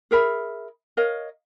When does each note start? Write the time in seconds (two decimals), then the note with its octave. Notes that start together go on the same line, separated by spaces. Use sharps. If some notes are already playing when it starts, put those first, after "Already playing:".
0.11 G#4 A#4 E5 B5
0.97 A#4 C#5 D#5 F5